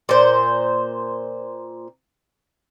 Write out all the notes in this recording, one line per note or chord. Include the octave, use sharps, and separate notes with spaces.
A#2 C5